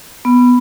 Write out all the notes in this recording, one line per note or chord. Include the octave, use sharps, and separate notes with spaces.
B3